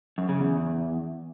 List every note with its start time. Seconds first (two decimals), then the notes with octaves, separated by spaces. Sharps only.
0.18 F#2
0.29 C#3
0.40 E2